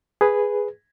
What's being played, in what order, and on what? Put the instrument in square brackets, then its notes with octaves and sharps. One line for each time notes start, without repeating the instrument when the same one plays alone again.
[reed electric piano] G#4 B4